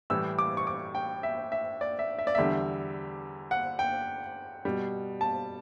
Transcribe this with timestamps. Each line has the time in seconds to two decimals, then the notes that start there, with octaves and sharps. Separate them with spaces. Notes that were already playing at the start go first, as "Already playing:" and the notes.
0.10 A2 E3 G3 E6
0.39 D6
0.57 C#6
0.67 D6
0.95 G5
1.23 E5
1.52 E5
1.81 D5
1.99 E5
2.19 E5
2.27 D5
2.35 E2 D3 G3 E5
3.51 F#5
3.79 G5
4.65 B2 G3
5.21 A5